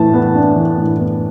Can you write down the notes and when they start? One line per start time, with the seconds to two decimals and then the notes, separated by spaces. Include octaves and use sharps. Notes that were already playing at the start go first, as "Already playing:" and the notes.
Already playing: A2 E3 A5
0.14 B3
0.35 D4
0.56 E3
0.77 A2
0.99 B3